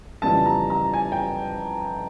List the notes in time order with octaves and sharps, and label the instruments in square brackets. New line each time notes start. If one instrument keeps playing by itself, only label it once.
[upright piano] F2 C#3 E3 G3 B3 A5
A#5
A#5
G#5
G5